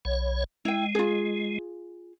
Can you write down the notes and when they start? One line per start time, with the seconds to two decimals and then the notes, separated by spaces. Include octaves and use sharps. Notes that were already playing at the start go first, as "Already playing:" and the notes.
0.05 B1 C#5
0.65 G#3 E4 G5
0.95 F4 G#4